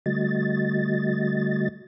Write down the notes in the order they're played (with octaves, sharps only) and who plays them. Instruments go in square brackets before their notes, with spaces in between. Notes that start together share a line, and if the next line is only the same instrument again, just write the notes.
[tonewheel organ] D3 G3 A3 F#4 D#5 A6